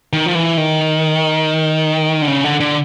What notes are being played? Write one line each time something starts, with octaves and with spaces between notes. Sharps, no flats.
D#3
F3
E3
D#3
D3
C#3
D3
D3